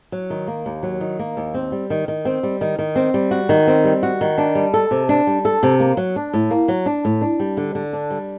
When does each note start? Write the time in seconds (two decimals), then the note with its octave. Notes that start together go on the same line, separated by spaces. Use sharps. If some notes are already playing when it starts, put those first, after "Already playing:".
0.12 F#3
0.30 D#3
0.47 A#3
0.66 D#2
0.83 F#3
1.01 D#3
1.19 A#3
1.37 D#2
1.54 C4
1.72 G3
1.90 D#3
2.08 D#3
2.25 C4
2.43 G3
2.61 D#3
2.79 D#3
2.96 C4
3.14 G3
3.31 F#4
3.49 D#3
3.67 C4
3.84 G3
4.03 F#4
4.21 D#3
4.38 D4
4.55 G3
4.74 A4
4.91 C3
5.09 D4
5.27 G3
5.45 A4
5.63 C3
5.80 A#3
5.97 F#3
6.16 D4
6.33 A2
6.51 A#3
6.68 F#3
6.86 D4
7.05 A2
7.21 D4
7.40 G3
7.57 D3
7.75 D3
7.93 D4
8.10 G3